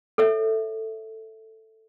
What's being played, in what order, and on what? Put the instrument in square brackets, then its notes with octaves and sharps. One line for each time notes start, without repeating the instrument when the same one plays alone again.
[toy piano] A4 C#5 E5